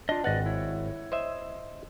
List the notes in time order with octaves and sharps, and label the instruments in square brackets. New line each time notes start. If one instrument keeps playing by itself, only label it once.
[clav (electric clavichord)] D4 [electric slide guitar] F4 D#5
[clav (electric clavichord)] G#1 F#5 [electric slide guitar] B4 D5 D#5
[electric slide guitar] E4 C#5
[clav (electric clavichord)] C5 D#5 E5